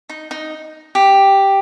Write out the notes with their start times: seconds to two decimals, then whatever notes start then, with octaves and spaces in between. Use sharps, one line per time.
0.09 D#4
0.31 D#4
0.95 G4